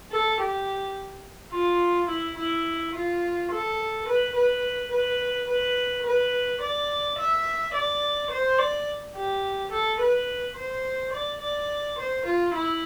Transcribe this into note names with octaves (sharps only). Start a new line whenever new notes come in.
A4
G4
F4
E4
E4
F4
A4
B4
B4
B4
B4
B4
D5
E5
D5
C5
D5
G4
A4
B4
C5
D5
D5
C5
F4
E4